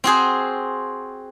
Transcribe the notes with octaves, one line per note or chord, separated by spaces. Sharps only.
C4 F#4 G#4 C5